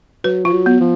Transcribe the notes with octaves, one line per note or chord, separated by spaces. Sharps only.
F#3 B4
F3 F4
F#3
B3
F3